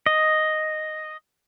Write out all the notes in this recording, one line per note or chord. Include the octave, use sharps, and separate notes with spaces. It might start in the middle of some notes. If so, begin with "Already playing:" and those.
D#5